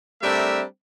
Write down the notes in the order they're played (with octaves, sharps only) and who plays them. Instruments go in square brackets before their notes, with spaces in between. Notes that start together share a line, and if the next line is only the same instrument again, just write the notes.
[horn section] G3 A3 C4 D4 A#4 E5